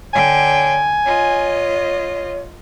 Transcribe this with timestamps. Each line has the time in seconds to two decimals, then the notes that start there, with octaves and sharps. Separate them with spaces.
0.14 D3 C#5 G5 G#5
1.05 F4 C#5 D#5